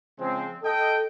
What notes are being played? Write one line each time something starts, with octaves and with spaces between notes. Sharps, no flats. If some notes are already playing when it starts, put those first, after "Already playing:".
C#3 F3 G#3 C4
A4 D#5 G5